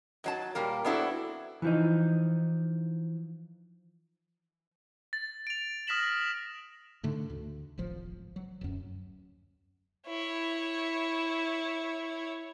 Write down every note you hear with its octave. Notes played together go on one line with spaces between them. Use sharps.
G#2 F#3 A5
A#2 G3 A#3 A#4
B3 C4 D4 E4 F#4 A4
E3 F3 D#4
A6
D7 F7
D#6 F6 A#6 B6 E7 F#7
G#2 D3 A3
D2
D1 G#1 F3
F#3
D1 F#2
E4 C#5